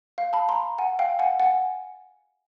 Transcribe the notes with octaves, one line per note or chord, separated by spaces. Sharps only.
F5
A5 B5
A#5 C6
F#5 G#5
F5 G5
F#5 G#5
F#5 G#5